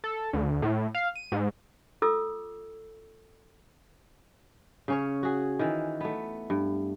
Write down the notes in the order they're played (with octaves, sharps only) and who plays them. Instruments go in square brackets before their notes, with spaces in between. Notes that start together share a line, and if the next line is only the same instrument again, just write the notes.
[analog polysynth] A4
D2
A2
F5
D#7
G#2
[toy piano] F4 A4 D6 E6
[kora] C#3 C#4 C#5
F#4 G#4
D#3 E3
A3 B3
G2